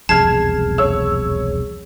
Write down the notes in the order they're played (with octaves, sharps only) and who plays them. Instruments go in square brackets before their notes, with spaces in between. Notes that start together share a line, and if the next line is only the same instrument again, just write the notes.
[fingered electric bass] E1 C2 F2 [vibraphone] G#4 [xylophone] A5 [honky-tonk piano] F6 G#6 C7
[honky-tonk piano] C#5 E6